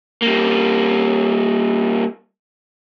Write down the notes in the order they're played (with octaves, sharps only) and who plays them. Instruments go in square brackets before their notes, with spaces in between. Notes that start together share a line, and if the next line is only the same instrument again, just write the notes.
[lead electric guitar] G3 A#3